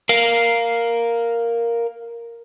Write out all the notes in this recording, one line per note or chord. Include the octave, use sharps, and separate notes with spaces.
A#4 F5